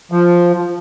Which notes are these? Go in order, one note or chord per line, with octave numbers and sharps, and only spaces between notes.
F3